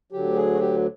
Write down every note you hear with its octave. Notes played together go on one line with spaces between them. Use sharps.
D2 D3 F#3 G4
G#4
F#4
G4